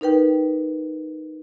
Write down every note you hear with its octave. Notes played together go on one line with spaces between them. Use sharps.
D#4 A#4 B4 G5